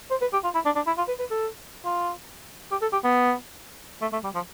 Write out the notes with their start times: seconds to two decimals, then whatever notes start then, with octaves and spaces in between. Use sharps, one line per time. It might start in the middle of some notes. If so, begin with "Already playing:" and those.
0.11 C5
0.22 B4
0.33 G4
0.44 F4
0.55 E4
0.66 D4
0.76 D4
0.87 E4
0.98 F4
1.08 B4
1.20 B4
1.31 A4
1.85 F4
2.72 G4
2.82 A4
2.93 G4
3.04 B3
4.02 A3
4.13 A3
4.24 G3
4.35 F3